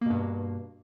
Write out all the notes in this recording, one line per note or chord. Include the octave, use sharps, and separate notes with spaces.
G2 B2 A#3